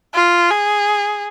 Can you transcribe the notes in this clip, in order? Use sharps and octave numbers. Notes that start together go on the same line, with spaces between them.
F4
G#4